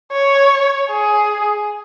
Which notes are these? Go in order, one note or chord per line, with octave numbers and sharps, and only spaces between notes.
C#5
G#4